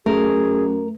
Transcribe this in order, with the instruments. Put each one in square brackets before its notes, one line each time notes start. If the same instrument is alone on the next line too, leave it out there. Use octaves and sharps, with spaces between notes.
[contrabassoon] F#2 [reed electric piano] A3 [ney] G#4 [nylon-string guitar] A#4